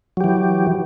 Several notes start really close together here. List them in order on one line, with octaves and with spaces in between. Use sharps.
F#3 G4 E3